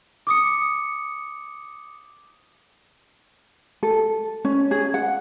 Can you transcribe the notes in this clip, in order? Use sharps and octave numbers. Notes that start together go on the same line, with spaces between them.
D6 D#6 C#7
A4
C#4
G#4
F#5